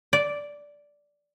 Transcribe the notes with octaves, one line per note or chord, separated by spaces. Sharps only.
D5